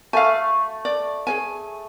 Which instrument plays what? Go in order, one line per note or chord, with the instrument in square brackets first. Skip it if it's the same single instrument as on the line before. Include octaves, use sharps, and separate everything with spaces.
[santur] A3 [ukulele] F5 G#5
[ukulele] D5
G#4 C#5 G#5